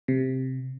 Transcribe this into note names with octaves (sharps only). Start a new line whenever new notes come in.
C3